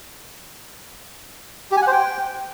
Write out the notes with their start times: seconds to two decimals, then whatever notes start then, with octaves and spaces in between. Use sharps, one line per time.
1.71 G4
1.77 G#5
1.82 F#5
1.87 C5
1.92 G5